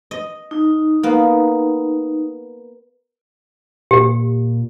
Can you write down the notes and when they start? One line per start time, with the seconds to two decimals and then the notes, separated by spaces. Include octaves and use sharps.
0.11 D#5
0.51 D#4
1.03 A#3 B3
3.91 A#2 G4